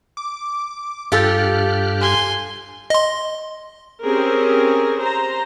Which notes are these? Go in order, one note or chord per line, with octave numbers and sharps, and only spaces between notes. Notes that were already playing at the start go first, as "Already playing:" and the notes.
D6
G2 F4 G4 A4 F6 F#6
G#5 C6
D#5 C6
C4 C#4 G4 G#4 A#4
C5 A#5